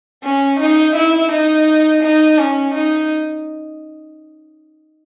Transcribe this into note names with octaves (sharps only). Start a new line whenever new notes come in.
C#4
D#4
E4
D#4
D#4
C#4
D#4